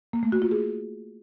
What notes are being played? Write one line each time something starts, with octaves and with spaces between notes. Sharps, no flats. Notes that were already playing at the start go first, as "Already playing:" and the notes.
A#3
A3
F#4
F4
G#4